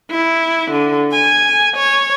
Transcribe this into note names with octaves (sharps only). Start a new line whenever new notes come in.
E4
D3
G#5
C#5